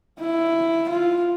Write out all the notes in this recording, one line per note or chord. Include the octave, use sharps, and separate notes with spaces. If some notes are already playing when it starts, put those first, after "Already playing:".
E4
F4